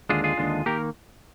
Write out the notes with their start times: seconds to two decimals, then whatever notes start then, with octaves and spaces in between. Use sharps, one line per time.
0.09 D#2 D3 G#3 D4 F4 G#4
0.24 F4 G#4
0.37 D#2 D3 G#3 D4
0.66 D#3 A#3 G4 A#4